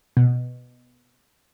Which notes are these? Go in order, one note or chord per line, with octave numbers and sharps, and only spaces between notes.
B2